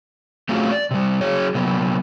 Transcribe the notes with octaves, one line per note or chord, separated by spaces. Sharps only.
A3 C4 C#4 F4 F#4 G#4
D5
C3 G3
F#3 G#4 C#5
C3 F#3 A#3 B3